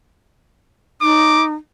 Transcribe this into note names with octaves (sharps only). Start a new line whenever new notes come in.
D#4 D6